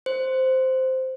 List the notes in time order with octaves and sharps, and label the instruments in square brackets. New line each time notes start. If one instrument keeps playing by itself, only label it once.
[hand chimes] C5